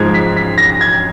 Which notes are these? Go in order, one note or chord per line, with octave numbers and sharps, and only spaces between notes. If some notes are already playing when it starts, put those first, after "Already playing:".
Already playing: G#2 F3 G#3 G#6
B6
B6
A#6
G#6